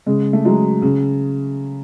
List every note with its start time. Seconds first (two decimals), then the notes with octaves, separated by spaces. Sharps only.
0.06 C#3 G#3
0.33 A3
0.45 F#3 G#3
0.82 C#3